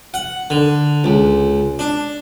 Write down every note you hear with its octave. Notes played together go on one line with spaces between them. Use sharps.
F#5
D3
C#2
D4